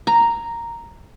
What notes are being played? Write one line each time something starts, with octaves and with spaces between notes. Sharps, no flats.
A#5